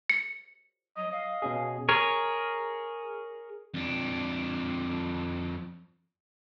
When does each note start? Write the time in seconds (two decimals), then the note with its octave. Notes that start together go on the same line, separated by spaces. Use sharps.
0.10 C#7
0.97 F#3 D#5
1.11 D#5 F5
1.42 B2 C#4 G#4
1.89 G#4 A#4 C#5
3.74 F2 D4